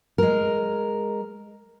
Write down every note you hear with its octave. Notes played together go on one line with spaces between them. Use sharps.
G#3 A#4